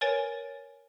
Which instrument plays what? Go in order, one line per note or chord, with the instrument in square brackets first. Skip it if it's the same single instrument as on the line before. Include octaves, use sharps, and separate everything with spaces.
[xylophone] A#4 B4 C#5 G#5 A6 D7